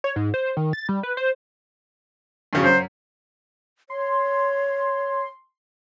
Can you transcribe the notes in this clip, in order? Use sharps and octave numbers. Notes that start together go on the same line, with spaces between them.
C#5
G#2
C5
D#3
A6
G3
B4
C5
G2 C#3 F#3
F#2 C5
C#5 C6